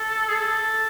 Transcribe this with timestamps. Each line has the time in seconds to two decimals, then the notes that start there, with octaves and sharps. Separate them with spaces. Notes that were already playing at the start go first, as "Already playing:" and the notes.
Already playing: A4
0.29 G#4
0.35 A4